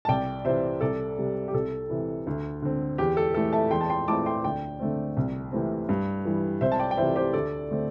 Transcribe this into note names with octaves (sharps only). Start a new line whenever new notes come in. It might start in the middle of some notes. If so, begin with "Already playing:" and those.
A5
C2 D5 G5
C3 E3 C4 C5 E5
C2 A4 D5
C3 G3
G4
C2 A4
C3 E3
D2
D3 C4
E2 G4
A4
E3 A3 A4
E5 A5
E2 G5 C6
A5
G5 C6
E3 A3 C4 A5 D6
G5 C6
D2 D5 G5
D3 A3 C4
C2
C3 E3 A3 C4
G2
E3 G3
C2 C5 E5
A5
D5 G5
G5
C3 E3 C5 E5
G4 C5
D2 A4 D5
D3 A3 C4